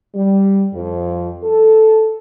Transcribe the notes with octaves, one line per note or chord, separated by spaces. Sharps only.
G3
F2
A4